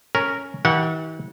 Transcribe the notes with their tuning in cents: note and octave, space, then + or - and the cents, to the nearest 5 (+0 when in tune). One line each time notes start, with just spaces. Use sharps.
C#4 +0 A#4 -10
E3 -45 G4 -25 F#5 -15